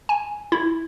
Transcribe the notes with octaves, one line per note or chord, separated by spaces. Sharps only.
G#5
E4